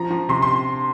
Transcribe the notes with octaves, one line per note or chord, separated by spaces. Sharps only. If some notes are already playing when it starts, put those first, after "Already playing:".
Already playing: F3 A#5
F3
C3 C6
C6